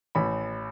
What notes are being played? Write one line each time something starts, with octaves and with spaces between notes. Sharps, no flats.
A1 B5